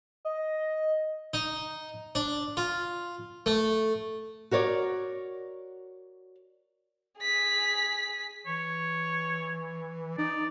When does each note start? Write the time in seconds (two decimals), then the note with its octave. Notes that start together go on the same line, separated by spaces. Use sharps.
0.25 D#5
1.34 D#4
2.15 D4
2.57 F4
3.46 A3
4.51 F#4 A#4 C#5 D5
7.19 G#4 B6
8.47 E3 C#5
10.18 D#4 D5